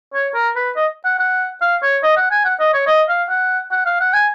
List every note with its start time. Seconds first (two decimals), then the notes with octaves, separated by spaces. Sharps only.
0.14 C#5
0.34 A#4
0.56 B4
0.76 D#5
1.05 F#5
1.19 F#5
1.61 F5
1.83 C#5
2.03 D#5
2.17 F#5
2.31 G#5
2.45 F#5
2.60 D#5
2.74 C#5
2.87 D#5
3.09 F5
3.29 F#5
3.72 F#5
3.86 F5
4.00 F#5
4.13 G#5